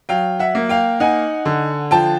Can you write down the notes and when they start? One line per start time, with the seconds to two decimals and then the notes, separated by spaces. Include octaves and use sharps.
0.09 F#3 F5 G5
0.39 E5 F#5
0.55 A#3
0.69 F5 G5
1.00 D#4 F#5 G#5
1.46 D3
1.91 F3 G5 A5